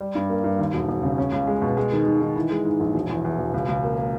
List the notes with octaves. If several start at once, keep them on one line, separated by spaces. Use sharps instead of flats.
G3
G2
A#3
G2
D#2
E1
E1
C#3
C#4
C#2
G#3
B2
G#3
D#3
D#3
D#3
E3
G#3
G#2
A#1
E1
E2
E2
E1
C#2
C#2
A#3
A#3